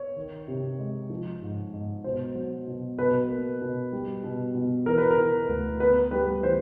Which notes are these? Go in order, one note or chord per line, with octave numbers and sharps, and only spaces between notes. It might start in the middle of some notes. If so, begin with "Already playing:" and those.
Already playing: C#5
D#3
C3
G#3
F3
G#2
G#2
B2 C5
F#3
B2
B2 B4
A#3
B2
G3
B2
B2
E3 A#4
B4
A#4
E3
D2
B3 B4
G3 B4
E3 C5